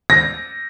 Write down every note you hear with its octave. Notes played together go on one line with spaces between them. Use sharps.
A#6